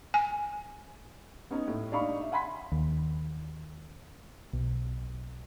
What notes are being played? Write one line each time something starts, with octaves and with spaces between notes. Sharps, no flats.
G#5
B3 C#4 D#4
A2
D4 D#4 F5 B5 C#6
E5
F#5 G#5 B5 C6 B6
D#2
B1